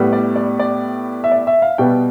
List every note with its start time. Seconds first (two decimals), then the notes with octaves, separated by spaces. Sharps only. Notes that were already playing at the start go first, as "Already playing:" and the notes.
Already playing: A2 G3 B3
0.13 D5
0.36 D5
0.59 D5
1.24 E5
1.32 D5
1.47 E5
1.62 F5
1.78 B2 G3 B3 G5